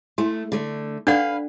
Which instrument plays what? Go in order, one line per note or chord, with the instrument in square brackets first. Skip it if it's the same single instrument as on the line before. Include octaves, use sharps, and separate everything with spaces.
[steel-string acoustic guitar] A3 [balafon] E4
[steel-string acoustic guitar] D3 A3
[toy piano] D4 D5 F#5 [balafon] A4 [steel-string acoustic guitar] B4 F5